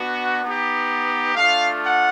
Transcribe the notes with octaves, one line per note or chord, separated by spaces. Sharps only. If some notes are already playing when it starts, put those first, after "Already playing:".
Already playing: B3 D4 F#4
B3 D#4 G4
A3 D4 F4 F5
F#5